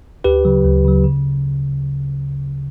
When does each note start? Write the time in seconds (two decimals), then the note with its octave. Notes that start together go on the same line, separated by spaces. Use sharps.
0.24 D2 G4 B4
0.45 C#3 F#3
0.64 D2
0.84 C#3 F#3
1.04 C#3